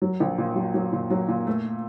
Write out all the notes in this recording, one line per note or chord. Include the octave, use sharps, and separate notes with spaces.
F#3
A#1
A#2
F#3
F#3
A#2
F#3
A#2
A3